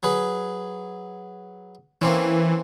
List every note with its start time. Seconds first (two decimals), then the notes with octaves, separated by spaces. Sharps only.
0.03 F#3 G#4 B4
2.01 E3 A#3 C4 C#4